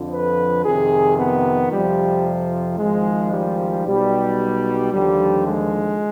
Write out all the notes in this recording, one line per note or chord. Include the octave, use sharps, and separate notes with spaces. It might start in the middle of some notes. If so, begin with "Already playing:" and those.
Already playing: F2 D3 F3
B4
F2 C3 D#3 G#4
B3
F2 C3 F3 G3
G#1 G#2 F3 G#3
G3
B1 B2 G3
D#2 D3 F3 G3
G#3